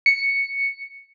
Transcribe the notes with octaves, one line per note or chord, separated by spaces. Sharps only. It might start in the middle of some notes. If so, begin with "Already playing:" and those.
C#7